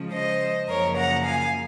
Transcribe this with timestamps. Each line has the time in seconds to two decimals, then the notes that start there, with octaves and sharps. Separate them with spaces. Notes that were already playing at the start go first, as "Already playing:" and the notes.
Already playing: C#3 F3 G#3 C#4
0.13 C5 D#5
0.68 F#2 C#3 F3 A#3 A#4 C#5
0.96 F#5 A#5
1.24 F5 G#5